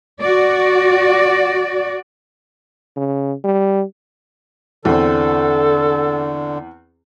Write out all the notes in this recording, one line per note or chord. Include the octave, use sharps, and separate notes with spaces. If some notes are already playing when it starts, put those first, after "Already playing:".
F#4 D5
C#3
G3
E2 D3 C4 A4